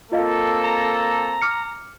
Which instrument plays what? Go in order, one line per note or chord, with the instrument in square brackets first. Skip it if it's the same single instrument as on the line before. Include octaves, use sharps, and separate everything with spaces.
[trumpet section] A#3 C4 A4 [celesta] F4 D#5 F5
[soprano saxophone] A#5
[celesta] D6 F6 C#7